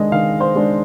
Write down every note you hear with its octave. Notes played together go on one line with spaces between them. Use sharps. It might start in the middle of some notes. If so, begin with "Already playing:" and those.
Already playing: D#3 G#3 D4 D#5
D#3 F5
C5
G#3 D4